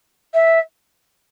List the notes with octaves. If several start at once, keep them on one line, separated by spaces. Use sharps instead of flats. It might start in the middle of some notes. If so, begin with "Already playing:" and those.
E5